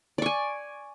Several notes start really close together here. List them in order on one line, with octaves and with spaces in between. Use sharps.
D5 C#6 G#5